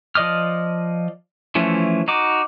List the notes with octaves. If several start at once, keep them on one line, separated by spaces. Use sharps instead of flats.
F3 D5 D#5 D#6 F6
E3 F3 A3 C#4
D#4 F#4 D6